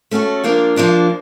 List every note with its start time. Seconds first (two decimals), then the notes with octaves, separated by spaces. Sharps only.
0.11 A3 C#4 F#4 A4
0.44 F3 A#3 D4 F4
0.76 F3 A#3 D4 F4